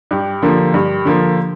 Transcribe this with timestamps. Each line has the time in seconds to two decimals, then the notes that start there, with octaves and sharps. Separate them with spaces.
0.11 G2 G4
0.42 D3 F3 A#3
0.74 G2
1.05 D3 F3 A#3